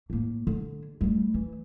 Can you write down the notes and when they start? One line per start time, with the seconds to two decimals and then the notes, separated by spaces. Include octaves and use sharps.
0.10 A2 A#3
0.47 D3
1.01 G3 A3
1.34 E3